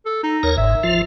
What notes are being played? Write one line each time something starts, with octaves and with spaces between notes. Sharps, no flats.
A4
D#4
D#2 A#4 C#5
G1 G#2 E5
F3 F4